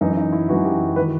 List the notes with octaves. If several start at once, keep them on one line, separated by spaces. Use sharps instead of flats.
F#2 E3 D#4
D#4
E4
F#2 E3 F#4
G4
B4
D#3